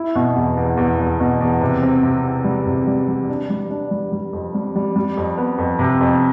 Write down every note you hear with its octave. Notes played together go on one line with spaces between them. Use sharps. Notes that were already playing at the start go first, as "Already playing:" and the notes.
Already playing: E4
B2
E2
E2
E2
E2
B2
E2
C3
C4
C3
C4
G3
C3
G3
G3
D4
G3
D4
G3
G3
F2
G3
G3
G3
F2
B3
F2
C3
F2